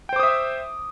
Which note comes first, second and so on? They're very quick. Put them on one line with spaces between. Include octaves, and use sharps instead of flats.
G5 C5 D6 D#6 E5